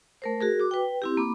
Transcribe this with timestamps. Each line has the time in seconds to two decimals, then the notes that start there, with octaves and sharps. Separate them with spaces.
0.22 A3 A#4 C5
0.41 F#4 G#4 A#4
0.59 F#4 D6
0.71 B4 G5
1.02 C4 E4 G4
1.17 A#3 B5 D6